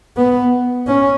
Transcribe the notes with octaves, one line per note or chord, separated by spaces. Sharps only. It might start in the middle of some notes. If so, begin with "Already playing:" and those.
B3
C#4